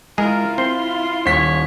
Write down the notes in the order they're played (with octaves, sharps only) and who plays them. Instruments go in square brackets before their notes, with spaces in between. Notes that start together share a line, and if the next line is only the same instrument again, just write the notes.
[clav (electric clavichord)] G#3 G#4 [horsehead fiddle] E4 F4 [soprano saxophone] A#4
[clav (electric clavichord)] C4 [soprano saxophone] C6
[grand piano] D#1 B6 [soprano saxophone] C#5